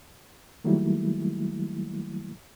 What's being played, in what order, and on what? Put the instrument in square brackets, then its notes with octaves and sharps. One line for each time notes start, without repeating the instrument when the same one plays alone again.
[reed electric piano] D#3 F#3 G3 A3 A#3 E4